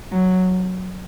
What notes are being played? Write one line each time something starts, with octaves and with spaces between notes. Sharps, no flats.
F#3